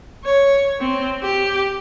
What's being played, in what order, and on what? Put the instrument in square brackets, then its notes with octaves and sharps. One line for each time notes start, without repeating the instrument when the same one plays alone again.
[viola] C#5
C4
G4